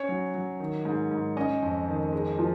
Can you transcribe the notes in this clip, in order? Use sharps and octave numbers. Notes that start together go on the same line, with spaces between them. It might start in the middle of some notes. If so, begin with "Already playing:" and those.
Already playing: C#4 C#5
F#3
F#3
D#3
G#2
G#2
C#4 D#5
F2
D#3
G#3
F3